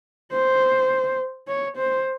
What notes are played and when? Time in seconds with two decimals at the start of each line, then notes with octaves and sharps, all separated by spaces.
0.32 C5
1.48 C#5
1.77 C5